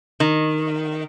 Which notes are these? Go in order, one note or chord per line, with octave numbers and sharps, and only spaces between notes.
D#3